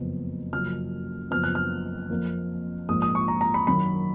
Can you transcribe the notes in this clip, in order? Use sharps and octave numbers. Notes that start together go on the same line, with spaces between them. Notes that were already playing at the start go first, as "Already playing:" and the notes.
Already playing: F#1 F2 F3 B3
F#1 F#2 F3 F6
F#1 F#2 F3 B3 F6
F#6
F6
F2 F3 A#3
A#1 G#2 F3 A#3 D#6
D#6
C#6
A#5
A#5
B5
F#2 D#3 F#3 B5